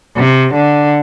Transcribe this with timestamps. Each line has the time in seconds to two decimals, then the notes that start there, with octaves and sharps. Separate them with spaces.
0.17 C3
0.54 D3